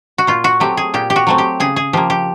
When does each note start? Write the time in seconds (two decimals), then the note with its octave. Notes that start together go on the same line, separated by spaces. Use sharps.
0.18 F#4
0.27 A#2 F4
0.44 F#4
0.60 F#3 A3 C4 G4
0.77 G#4
0.94 A#2 G4
1.10 G4
1.16 F#4
1.27 F#3 A3 C4
1.38 G4
1.60 C#3 G#4
1.76 G#4
1.93 F3 A#3 G4
2.10 G4